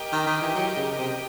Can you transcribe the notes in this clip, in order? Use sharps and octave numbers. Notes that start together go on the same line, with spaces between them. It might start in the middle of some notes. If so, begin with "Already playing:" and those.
Already playing: G4 A#4 D#5 G5
D#3
D#3
E3
F#3
C#3
C3